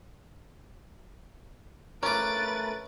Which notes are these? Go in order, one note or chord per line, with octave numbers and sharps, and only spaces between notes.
A3 C#4 A#4 B4 D6 A6 D7